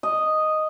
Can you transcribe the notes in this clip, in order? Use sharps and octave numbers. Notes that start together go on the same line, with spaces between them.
D#5